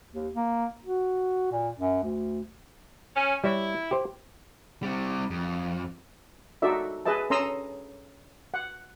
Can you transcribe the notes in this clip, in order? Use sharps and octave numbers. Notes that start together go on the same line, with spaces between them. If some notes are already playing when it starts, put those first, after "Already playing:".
D#2
A#3
F#4
A#2
F#2
D2
C#4
G3 E4 C#5
G4 C5
G3 C4
F2
D#4 F#4 A4 D5 E5
G#4 B4 D#5 E5 A5
C#4 A4 A#5 C6 D#6 E6
F#5